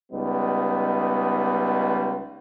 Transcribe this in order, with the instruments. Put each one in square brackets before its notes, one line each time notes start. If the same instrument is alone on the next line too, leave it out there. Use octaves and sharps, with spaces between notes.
[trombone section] C#2 G3 B3 D#4